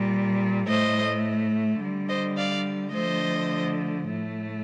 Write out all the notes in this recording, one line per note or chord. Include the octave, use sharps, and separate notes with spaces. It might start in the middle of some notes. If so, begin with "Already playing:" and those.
Already playing: A#2 G3
A2 A3 C5 D#5
D3 G3
C5 D#5
D5 F5
D3 F3 A3 C5 D#5
A2 A3